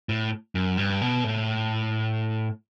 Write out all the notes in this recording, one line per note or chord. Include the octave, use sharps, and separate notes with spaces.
A2
F#2
G2
B2
A2